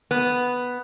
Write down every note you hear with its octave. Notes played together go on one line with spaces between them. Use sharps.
B3